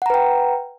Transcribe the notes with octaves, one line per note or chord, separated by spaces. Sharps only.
B4 F#5 G5 A#5